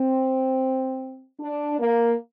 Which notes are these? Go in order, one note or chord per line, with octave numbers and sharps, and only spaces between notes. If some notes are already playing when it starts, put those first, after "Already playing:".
Already playing: C4
D4
A#3